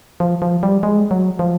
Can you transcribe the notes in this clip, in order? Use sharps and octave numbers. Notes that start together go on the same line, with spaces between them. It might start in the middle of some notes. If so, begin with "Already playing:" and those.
F3
F3
G3
G#3
F#3
F3